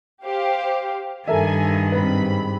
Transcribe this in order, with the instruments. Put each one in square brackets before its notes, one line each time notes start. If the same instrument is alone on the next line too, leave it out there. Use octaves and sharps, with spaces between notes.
[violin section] G4 C5 F5
[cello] G2 D#3 [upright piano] A4 A#4 E5 [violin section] G#5
[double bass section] G#2 G3 C4 [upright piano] B4 [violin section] B5